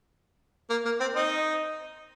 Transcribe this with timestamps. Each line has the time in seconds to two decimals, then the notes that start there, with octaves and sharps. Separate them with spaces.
0.70 A#3
0.85 A#3
1.00 C4
1.15 C4 D#4